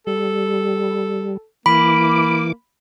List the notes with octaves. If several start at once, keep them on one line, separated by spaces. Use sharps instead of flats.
G3 A4
E3 A#3 B5 D6